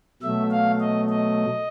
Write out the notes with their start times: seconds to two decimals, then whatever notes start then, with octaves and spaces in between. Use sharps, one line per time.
0.22 B2 F#3 A3 E5
0.51 F5
0.80 D#5
1.09 D#5